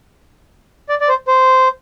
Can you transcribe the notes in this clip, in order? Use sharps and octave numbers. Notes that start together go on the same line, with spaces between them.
D5
D5
C5
C5